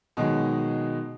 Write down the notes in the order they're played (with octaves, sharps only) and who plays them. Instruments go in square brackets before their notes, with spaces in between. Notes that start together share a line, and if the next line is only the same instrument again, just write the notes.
[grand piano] B2 D#3 F#3 G#3 G#4